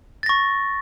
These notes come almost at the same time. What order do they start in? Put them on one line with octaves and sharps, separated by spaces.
A6 A#6 C#6